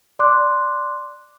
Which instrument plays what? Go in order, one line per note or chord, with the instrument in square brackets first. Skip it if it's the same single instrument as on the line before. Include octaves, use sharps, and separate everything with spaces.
[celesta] D5 C6 D6 F#6